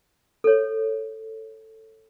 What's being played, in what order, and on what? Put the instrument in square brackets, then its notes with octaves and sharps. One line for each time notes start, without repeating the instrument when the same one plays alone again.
[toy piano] A4 C#5